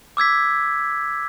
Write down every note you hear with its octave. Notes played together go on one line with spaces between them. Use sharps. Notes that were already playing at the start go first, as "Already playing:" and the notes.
D6 E6 G#6 B6